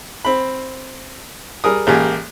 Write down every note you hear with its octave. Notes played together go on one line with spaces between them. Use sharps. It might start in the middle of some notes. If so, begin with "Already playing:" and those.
C4 B5
G3 G#4 A#4 D#6
A1 G#3 A#3 G4 G#5